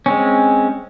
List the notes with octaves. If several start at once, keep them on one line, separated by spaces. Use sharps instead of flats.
G#3 C4 C#4